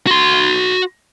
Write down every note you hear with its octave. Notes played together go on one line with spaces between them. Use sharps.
F#4 C6